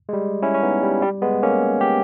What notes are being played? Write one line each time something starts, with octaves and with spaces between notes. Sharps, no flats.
G#3
G3
C#4 E4
C#4
B3 D#4
G3
G3
G#3 B3
A#3 C#4
G4